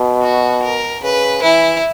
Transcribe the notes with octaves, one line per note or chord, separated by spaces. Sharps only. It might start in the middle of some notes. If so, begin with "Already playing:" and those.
Already playing: B2
F#4
A#4
C#3 B4
E3 E4